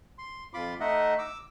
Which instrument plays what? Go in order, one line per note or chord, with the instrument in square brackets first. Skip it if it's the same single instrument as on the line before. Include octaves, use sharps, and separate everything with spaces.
[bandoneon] C6
F2 F4 B5 C6 D6
A3 D#4 D#5 E5 F#5
D6 E6